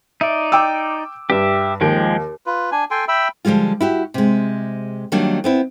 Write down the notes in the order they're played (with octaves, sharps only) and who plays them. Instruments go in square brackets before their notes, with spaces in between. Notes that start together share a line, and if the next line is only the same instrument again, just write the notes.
[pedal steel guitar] D#4 D5 [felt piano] E5
[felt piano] G5 D6 E6
[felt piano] G2 [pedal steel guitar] G4 E5
[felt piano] D#2 [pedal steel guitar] F3 G#3 G5
[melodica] F4 B4
D4 G#5
A4 G5 G#5 C6
E5 G5 B5 E6
[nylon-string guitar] D3 F3 G3 G#3 F4
E4 F#4 G4
C3 G#3
D#3 F#3 G3 A#3 D4
B3 C4 E4